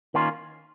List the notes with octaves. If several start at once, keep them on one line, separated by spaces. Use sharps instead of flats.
D#3 A#3 C#4 F4